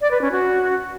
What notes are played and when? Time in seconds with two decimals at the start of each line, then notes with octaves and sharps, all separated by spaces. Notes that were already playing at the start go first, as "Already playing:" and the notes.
0.01 D5
0.11 B4
0.21 C#4
0.32 F#4